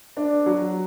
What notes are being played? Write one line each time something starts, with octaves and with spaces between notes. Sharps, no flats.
D4
F#3